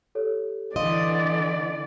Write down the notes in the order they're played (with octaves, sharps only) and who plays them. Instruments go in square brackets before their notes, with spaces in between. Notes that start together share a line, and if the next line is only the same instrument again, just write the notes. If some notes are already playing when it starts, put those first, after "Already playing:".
[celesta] G4 A4 C#5
[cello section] D3 E3 [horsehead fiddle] D5 [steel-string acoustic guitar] D#5 [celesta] F5 C6